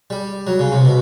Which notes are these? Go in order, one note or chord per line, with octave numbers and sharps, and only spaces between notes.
G3
F#3
C#3
C3
B2